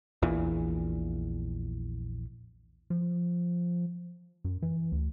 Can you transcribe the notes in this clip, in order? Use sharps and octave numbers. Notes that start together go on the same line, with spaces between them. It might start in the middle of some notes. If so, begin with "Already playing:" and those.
A#1 E2 A#2 E3
F3
F#2
E3
D2